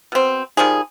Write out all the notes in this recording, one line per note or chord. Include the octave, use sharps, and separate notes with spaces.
B2 C4
D#3 F3 G3 G#4